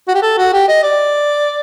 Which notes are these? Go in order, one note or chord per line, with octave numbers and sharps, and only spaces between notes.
F#4
G4
A4
F#4
G4
D#5
D5